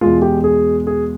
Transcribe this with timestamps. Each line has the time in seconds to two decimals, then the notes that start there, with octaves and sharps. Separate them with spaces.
0.01 E2 B2 G#3 F4
0.22 G4
0.44 G#4
0.87 G#4